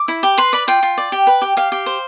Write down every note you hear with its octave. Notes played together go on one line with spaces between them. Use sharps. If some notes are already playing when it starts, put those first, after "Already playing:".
Already playing: D6
E4
G4
B4 C6
D5 B5
F4 G5
F4
D5
G4
B4
G4
G4 F5
G4
C5